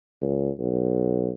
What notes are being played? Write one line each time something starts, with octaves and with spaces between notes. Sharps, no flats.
C#2
B1